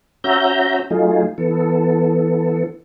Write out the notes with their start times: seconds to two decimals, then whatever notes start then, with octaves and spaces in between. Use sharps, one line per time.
0.24 C#4 F#4 E5 A#5 G6
0.90 F#3 A3 D#4 F4 G#4
1.38 E3 B3 A4